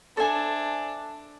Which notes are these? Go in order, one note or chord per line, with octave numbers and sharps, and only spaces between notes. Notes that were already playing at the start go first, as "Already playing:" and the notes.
D4 A4 C5 E5 G#5